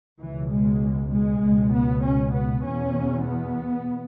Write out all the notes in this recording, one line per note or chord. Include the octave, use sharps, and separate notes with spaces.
C#2 B2 E3
G#3
G#3
C#2 B2
B3
C#4
B3
E2 B2 C#4
B3